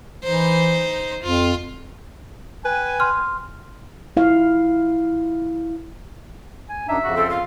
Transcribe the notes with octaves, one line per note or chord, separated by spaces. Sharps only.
E3 D#4 C5
F2 F4
B4 G5 G#5
C6 F6
E4 F5
G#5
F#2 D4 D#4 E5
F2 C#3 F#4
C4 A4
F4 F5